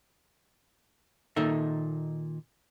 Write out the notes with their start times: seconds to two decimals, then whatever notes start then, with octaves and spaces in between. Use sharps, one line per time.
1.36 A#2 D#3 D#4 A4 D#5 E5